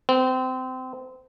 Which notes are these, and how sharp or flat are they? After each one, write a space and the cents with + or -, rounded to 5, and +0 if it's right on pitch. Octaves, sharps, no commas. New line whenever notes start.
C4 -25